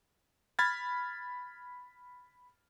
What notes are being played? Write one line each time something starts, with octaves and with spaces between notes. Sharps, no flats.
B5 F6 G#6 A6